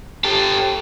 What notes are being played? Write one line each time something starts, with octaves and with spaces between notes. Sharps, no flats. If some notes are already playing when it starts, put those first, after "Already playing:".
G4 A4